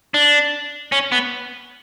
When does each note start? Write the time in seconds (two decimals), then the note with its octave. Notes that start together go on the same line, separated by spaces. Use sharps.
0.14 D4
0.92 C#4
1.12 B3